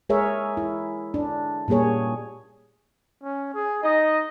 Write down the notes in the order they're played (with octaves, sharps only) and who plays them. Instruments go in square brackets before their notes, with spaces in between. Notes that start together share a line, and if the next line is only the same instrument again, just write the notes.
[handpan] G#3 G#4 A#4 C#5 E5
E4
D4
A#2 G3 A#3 G#4 C#5
[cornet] C#4
G#4
[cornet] D#4 [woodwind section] D#5